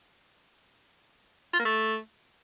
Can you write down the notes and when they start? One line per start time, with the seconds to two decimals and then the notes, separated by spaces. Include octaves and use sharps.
1.54 F4
1.59 A#3
1.65 A3